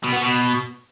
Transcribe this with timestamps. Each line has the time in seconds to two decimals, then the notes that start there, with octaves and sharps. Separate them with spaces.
0.03 B2
0.13 B3
0.22 B2